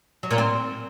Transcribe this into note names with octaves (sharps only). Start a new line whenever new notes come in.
F#3
A#2
C4